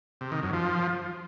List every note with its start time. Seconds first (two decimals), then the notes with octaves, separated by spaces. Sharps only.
0.21 C3
0.32 D#3
0.42 F#2
0.53 F3